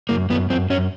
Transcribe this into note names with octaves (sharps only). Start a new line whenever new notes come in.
F#2 A#3
F#2 B3
F#2 C4
F#2 C#4